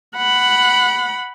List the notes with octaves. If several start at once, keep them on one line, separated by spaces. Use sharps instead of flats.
F#5 B5